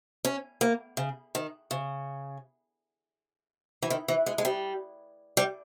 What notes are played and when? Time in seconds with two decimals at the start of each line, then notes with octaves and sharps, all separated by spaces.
0.25 C#4
0.61 A#3
0.97 C#3
1.35 D#3
1.71 C#3
3.82 E3
3.90 D#3
4.08 E3
4.26 G#3
4.38 G#3
4.45 G3
5.37 G3